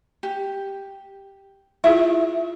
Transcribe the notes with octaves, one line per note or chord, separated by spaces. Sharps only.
G4
E4 F4 G#4 E5